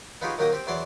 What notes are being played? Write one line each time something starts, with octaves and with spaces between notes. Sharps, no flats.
B3 D#4 F4 G4 G#4 C#5
D#3 F#3 A#3 G4 D#5 D#6
C4 G4
E2 F#3 D5 C6 D6